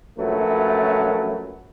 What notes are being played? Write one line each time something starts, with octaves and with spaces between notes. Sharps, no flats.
A#1 F#2 F#3 A3 B4